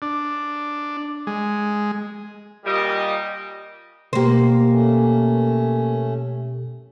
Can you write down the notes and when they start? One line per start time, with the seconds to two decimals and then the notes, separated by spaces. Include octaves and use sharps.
0.02 D4
1.27 G#3
2.65 A#2 G3 D#5
4.13 B2 A#3 G4 C5
4.70 A3 C#4